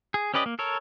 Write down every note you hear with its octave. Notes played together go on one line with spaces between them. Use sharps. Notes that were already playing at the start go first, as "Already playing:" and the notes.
G#4
C#4 G4 B4 D5 D#5
A#3
A4 A#4 C#5